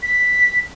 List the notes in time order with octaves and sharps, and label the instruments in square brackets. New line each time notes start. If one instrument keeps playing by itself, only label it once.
[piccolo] B6